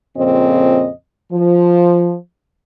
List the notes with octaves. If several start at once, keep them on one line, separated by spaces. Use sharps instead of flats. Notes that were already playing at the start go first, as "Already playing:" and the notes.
F2 A#2 C#3 C4 D#5
F3